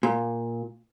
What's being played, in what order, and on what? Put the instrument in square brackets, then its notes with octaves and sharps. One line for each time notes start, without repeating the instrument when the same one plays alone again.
[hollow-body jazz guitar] A#2